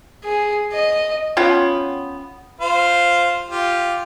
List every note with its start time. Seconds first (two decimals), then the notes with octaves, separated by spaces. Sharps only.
0.24 G#4
0.72 D#5
1.37 B3 C#4 F4 G5
2.61 F4 C5 F5
3.50 F4 G4